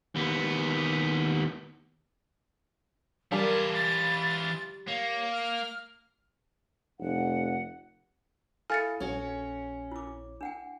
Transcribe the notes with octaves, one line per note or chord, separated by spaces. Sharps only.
D#2 B3
E3 G3 F4 A#4 A5
A6
A#3 C#5
F6
F1 F#5
E4 A4 F5 G#5 C#6 F6 A6 C#7
A#1 C#4 F#4 C#5
E4 D6
D4 F#5 G5